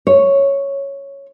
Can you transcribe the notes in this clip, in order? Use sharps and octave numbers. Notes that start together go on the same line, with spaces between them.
C#5